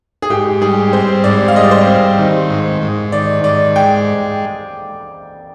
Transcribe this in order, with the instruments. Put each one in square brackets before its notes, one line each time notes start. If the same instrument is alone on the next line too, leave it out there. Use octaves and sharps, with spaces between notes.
[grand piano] G#4
[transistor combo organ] G#2 [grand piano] G4
[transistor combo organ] G3 [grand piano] G#4
[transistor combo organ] C4 [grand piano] C5
[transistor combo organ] G#2 [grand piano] D5
[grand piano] F5
[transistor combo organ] G3 [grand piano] D#5
[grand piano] D5
C5
[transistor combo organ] C4
D#3
G#2
G#2
[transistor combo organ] D#3 [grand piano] D5
[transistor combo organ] G#2 [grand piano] D5
[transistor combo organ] G#3 [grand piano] G5